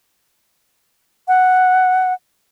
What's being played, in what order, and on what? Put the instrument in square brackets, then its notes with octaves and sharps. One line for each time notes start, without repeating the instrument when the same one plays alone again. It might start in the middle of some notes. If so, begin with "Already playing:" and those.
[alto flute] F#5